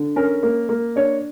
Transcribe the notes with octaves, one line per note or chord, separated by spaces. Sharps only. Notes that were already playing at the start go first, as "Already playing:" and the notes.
Already playing: D3
C#4 A#4
A#3
A#3
D4 C#5